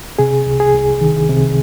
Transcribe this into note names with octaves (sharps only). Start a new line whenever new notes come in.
C3 G#4
C2
G#4
C2
D#3
C3